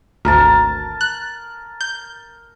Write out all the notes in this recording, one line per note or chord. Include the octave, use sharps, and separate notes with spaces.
G#1 D2 A#4 A5
F#6
G6